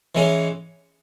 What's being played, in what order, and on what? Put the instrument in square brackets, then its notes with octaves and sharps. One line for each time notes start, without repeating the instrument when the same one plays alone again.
[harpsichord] E3 G#3 C#4